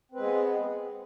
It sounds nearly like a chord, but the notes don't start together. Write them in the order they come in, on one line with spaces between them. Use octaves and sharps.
C4 B4 G#3 G#4 B3